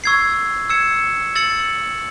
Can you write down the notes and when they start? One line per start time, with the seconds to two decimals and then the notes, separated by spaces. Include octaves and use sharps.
0.04 C#6 E6 G#6 C7
0.69 E6 G#6 C#7 E7
1.36 E6 A6 C#7 F#7